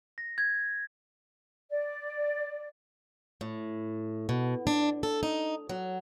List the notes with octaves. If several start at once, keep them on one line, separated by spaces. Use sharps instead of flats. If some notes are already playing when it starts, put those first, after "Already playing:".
A#6
G#6
D5
A2
B2
D4
A4
D#4
F#3